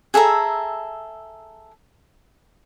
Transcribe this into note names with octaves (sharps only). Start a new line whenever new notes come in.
G#4 A4 E5 A#5